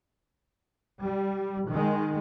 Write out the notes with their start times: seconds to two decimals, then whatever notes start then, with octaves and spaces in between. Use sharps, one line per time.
1.00 G3
1.68 D#3 G#3